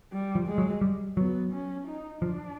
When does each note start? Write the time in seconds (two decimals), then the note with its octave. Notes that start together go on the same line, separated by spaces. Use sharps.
0.12 G3
0.35 F3
0.47 G#3
0.58 F#3
0.81 G3
1.17 F#3 B3
1.52 C#4
1.87 D#4
2.22 F3 D4